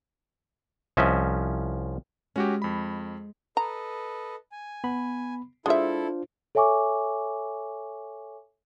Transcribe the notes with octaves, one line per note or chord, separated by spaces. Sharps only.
C2 F3 C#4 D#5 E5
G#3 C#4 F#4 G4
F2 B5
A4 B4 D#5 A#5
G#5
B3 B5
G#3 D4 E4 F4 A4 C5 E5
A4 C#5 E5 G#5 C#6 D6